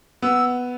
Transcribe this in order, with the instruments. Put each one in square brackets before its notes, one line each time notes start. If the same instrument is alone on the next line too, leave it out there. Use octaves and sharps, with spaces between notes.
[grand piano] B3 [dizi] E6